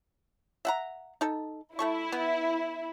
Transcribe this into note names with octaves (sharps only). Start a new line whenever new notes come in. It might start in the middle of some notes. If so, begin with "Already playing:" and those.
E5 F#5 A#5
D#4 A4
A3 E4 A4 C#6
B3